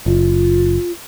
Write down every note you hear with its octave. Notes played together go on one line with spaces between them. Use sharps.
F#1 F4